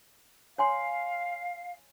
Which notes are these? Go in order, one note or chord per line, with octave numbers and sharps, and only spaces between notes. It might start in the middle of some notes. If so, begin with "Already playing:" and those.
C#5 F5 G#5 C6